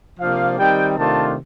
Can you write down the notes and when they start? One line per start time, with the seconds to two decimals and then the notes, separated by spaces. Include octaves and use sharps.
0.19 C3 F3 A#3 D4 F4 F5
0.58 D#3 G3 C4 D#4 G5
0.97 C3 D#3 A3 D4 F4 A5